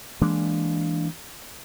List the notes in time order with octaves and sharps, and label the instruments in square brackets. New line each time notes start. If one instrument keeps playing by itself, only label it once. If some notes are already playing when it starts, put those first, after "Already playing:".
[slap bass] E3 G#3 A#3 D4